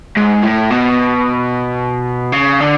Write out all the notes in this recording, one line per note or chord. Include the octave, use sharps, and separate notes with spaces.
G#2
A2
B2
C#3
D3